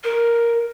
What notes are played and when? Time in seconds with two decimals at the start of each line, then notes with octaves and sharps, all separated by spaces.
0.04 A#4